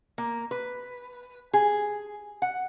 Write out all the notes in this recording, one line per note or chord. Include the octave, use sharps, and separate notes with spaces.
A#3
B4
G#4
F#5